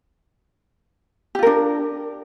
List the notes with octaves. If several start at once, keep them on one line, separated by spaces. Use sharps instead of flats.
D4 F4 G4 A#4